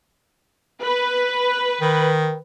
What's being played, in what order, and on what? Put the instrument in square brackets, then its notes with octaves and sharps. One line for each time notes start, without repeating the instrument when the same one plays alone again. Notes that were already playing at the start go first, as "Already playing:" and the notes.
[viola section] B4
[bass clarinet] D#3